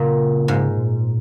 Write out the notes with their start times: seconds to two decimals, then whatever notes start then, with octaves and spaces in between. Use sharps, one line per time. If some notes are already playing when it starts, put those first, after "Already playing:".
Already playing: A#2 C#3
0.48 G#2
0.77 A#2